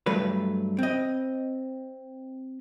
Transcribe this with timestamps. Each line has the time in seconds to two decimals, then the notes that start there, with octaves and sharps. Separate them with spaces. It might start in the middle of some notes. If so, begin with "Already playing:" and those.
0.06 G2 F#3 A3 B4
0.79 C4 D#5